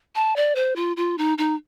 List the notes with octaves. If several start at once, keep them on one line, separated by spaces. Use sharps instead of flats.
A5
D5
C5
F4
F4
D#4
D#4